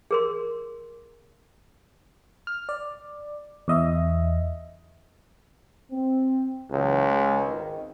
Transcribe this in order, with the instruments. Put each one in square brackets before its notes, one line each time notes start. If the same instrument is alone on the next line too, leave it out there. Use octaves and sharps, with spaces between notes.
[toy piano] G#4 A#4 C6
[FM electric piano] F6
D5
E2 D#5 E5
[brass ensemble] C4
[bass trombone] C#2 [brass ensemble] C#3 E3 F#3
[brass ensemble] G#3
G#1 D#3